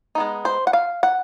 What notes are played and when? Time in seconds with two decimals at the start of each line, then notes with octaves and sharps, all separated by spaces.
0.15 G#3 B3 D#4
0.45 C5
0.67 F#5
0.73 F5
1.03 F#5